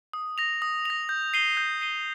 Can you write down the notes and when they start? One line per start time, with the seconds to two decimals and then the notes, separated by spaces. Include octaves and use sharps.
0.13 D#6
0.38 A#6 F7
0.62 D#6
0.85 A#6 F7
1.09 G6
1.34 C7 D#7 G7
1.57 G6
1.81 C7 D#7 G7